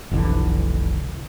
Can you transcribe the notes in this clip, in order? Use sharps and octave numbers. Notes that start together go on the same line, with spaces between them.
F1 B1 D3 E3